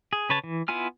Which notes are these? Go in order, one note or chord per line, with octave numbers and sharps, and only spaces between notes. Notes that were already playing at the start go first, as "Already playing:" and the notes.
G#4
C#3 B4 C#5 A5
E3
B3 E4 F4 G#5 F6